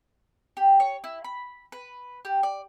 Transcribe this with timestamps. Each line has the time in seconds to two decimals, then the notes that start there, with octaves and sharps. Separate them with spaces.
0.57 G4
0.80 C#5
1.04 E4
1.24 B5
1.72 B4
2.25 G4
2.43 D5